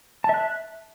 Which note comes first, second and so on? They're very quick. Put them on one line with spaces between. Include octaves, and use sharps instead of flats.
A5 E5 F#6